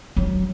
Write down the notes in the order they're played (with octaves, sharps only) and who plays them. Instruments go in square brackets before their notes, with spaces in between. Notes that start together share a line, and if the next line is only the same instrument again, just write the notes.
[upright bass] F#3